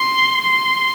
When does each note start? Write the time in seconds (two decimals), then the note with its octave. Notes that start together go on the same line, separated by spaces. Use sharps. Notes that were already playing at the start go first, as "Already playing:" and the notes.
Already playing: C6
0.43 C6